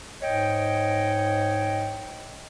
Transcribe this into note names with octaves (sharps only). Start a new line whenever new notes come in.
G#2 C#5 D#5 G5